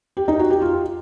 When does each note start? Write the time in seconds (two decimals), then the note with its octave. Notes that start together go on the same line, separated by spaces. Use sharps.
0.17 G4
0.28 D#4
0.39 F#4
0.50 G4
0.62 F4